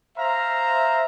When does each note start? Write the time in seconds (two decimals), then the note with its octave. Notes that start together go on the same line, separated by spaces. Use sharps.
0.18 C5 E5 F5 A#5